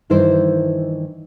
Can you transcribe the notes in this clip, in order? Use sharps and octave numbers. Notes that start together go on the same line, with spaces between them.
G2 D#3 E3 E4 C5